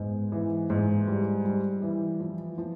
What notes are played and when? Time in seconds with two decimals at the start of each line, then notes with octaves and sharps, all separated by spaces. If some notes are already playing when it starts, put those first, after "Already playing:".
Already playing: G#2 B3
0.32 E3
0.70 G#2
1.07 G3
1.45 G3
1.82 E3
2.20 F3
2.58 F3